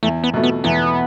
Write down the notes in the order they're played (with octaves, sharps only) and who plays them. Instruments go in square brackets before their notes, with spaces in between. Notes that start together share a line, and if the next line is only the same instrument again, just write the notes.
[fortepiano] E2 [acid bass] A3
[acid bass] B3
[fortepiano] B2 A3
[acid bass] B3
[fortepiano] E2 [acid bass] B3